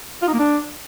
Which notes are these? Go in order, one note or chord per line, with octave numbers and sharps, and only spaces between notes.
F4
D#4
A#3
D4